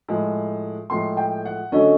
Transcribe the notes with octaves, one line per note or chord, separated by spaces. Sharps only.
A2 F3 G#3
A2 F3 G#3 C6
G5
F#5
D3 F#3 A3 C#4 D#5